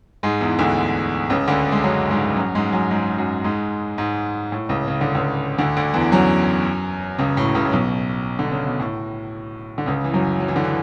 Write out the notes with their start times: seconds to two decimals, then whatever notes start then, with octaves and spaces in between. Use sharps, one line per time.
0.23 G#2 G#3
0.41 E2 E3
0.59 D2 D3
1.30 C#2 C#3
1.48 D2 D3
1.72 G#3
1.84 F#2 F#3
2.10 G#2 G#3
2.37 F#2 F#3
2.55 G#2 G#3
2.72 F#2 F#3
2.91 G#2 G#3
3.18 F#2 F#3
3.44 G#2 G#3
3.98 G#2 G#3
4.52 A2
4.69 C#2 C#3
4.88 C#3
5.01 D3
5.15 C#2 C#3
5.58 D2 D3
5.77 D2 D3
5.94 E2 E3
6.12 F#2 F#3
7.18 C#2 C#3
7.37 A2
7.55 C#2 C#3
7.65 A2
7.72 B1 B2
8.39 D3
8.51 C#3
8.66 B2
8.79 A2
9.78 D3
9.86 C#2 C#3
10.04 E3
10.14 F#2 F#3
10.40 F#3
10.48 E3
10.56 D3
10.64 E3